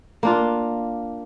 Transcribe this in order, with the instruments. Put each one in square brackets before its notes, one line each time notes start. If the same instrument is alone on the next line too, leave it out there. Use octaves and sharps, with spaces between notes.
[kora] A#3 D4 F4